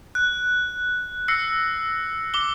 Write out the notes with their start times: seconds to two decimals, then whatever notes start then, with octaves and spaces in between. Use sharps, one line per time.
0.15 F#6
1.28 E6 A#6 C7 C#7
2.34 D6 G7